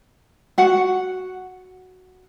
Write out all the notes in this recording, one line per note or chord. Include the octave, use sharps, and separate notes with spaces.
F#4 F#5